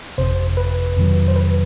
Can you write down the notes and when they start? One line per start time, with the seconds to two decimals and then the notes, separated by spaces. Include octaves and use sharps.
0.18 G1 F2 C3 C5
0.57 B4
0.96 F2 C3 D#3 F#3
1.28 C5
1.36 B4